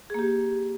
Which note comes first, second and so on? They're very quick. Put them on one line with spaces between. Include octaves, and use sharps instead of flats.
G#4 A#3 G4